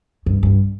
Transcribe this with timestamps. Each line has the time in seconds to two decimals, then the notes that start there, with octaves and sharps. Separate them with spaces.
0.26 G2
0.43 G2